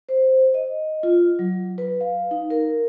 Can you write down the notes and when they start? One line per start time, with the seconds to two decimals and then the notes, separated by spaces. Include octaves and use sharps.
0.09 C5
0.54 D#5
1.03 F4
1.39 F#3
1.78 B4
2.01 F5
2.31 D#4
2.50 A#4